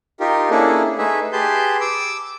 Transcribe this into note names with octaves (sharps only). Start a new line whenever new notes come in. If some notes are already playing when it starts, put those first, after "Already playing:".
D#4 F4 G4 A#4
A#3 C#4 D4 E4 G#4 A4
A3 D#4 G#4 B4 E5
G4 G#4 B4 A5 C6 G6
D6 E6